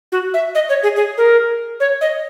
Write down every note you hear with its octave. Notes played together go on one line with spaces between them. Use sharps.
F#4
E5
D#5
C#5
G#4
G#4
A#4
C#5
D#5